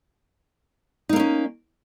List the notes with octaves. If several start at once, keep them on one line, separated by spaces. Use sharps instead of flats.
A#3 C4 C#4 D#4